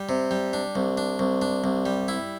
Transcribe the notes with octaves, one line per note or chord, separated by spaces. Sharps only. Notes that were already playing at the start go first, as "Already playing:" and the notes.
Already playing: G3
C3
G3
D4
C2
D4
C2
D4
C2
G3
E4